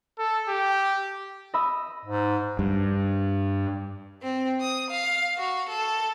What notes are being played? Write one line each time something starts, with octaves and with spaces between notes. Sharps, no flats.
A4
G4
D#5 B5 E6
G#2
G2
C4
D#6
F5
F#4
A4